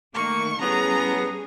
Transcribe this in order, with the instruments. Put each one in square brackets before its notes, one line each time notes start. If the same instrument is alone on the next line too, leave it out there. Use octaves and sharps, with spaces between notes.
[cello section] D#3 A3 [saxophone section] A#3 [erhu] C#6
[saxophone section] A2 F#3 B3 [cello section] G3 C#4 G#4 [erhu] A#5